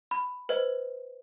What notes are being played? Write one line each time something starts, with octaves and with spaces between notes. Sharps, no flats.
B5
B4 C5 D#5